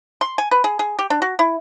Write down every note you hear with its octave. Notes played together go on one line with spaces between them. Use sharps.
C6
G#5
B4
G#4
G#4
G4
D4
F#4
E4